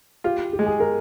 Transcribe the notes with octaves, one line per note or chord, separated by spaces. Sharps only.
F4 G4
G4
G#3
G#4
A#4